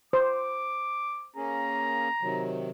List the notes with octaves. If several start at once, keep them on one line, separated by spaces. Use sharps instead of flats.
C5 D6
A#3 C#4 G#4 A#5
C3 D#3 F#3